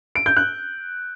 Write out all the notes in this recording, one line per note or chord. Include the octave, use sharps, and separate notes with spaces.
D7
G6
F#6